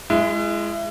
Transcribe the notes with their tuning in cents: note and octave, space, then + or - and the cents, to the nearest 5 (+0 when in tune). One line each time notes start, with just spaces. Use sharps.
G#3 +5 E4 +35